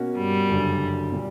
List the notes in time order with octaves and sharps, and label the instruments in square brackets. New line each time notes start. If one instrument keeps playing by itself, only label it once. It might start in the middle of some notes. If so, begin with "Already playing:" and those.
Already playing: [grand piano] B2 A#3 C#4 F#4
[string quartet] G2 G3
[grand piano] F#1 F#2 D3
A#2 G3